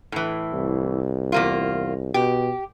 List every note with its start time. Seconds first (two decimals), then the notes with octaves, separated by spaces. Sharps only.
0.12 A2 E3
0.53 C2
1.32 E2 A#3 F4
2.14 B2 G4